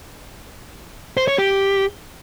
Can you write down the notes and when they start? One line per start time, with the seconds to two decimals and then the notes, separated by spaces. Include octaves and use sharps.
1.17 C5
1.28 C#5
1.38 G4